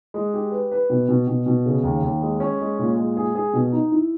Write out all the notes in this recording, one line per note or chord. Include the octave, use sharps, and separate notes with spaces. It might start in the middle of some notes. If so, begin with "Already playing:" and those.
G#3
G4
B4
B4
B2
B2
B2
B2
C#3
D#2
D#2
G#3
C#4
G#3
A#2
G#3
G#4
G#4
B2
D#4
E4